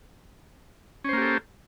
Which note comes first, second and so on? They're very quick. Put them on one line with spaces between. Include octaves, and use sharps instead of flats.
C#4 C5 A#3 G4 A4